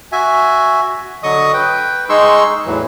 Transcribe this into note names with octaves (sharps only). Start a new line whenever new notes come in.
F#4 E5 G#5
D3 F#3 D#5 C#6 D#6
B4 G5
G#3 D#4 G#4 C6 C#6 E6
E2 A2 E3 F#3